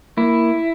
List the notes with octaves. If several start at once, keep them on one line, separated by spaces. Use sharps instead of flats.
A#3 E4